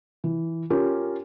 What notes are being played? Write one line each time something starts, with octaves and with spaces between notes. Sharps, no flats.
E3
C#4 F4 G4 A#4